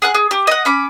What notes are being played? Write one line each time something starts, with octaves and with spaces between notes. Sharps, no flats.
G#4 F#5 F#6
G#4
G4
D#5 F#5
C#4 B5 D6